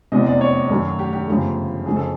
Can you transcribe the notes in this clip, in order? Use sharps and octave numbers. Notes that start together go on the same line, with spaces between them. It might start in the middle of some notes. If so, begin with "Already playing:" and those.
F1 E2 C3 D#5
D5
C#5
F#2 D#3 F#3 A3
G4
G4
G1 F#2 C#3 F3 A3
F#1 F2 C#3 F3 G#4
A4